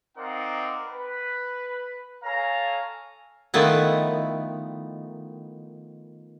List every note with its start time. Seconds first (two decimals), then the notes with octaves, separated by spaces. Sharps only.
0.17 C4 D#4 A#4 D5 F5 F#5
0.86 B4
2.24 A4 C#5 F5 G#5 A#5
3.54 D#3 F3 A3 B3 E4